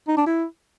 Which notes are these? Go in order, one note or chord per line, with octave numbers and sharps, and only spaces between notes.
D#4
D4
E4